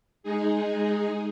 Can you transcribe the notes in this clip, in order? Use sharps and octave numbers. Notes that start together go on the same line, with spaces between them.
G#3 D#4 G#4